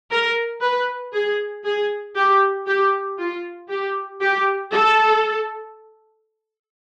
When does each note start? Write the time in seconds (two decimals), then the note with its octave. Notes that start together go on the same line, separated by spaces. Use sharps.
0.11 A#4
0.61 B4
1.13 G#4
1.65 G#4
2.16 G4
2.67 G4
3.19 F4
3.69 G4
4.21 G4
4.72 A4